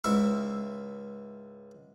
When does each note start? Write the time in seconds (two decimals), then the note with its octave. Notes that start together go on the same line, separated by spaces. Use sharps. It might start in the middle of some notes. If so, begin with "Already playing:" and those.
0.04 C#2 G#2 E4 E5 C#6